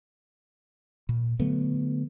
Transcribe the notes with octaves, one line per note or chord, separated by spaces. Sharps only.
A#2
D3 F#3 A3 B3